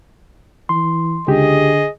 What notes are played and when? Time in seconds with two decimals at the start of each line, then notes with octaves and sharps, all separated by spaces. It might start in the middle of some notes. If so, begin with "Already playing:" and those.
0.69 E3 C6
1.28 C#2 D3 G4 G#4 D#5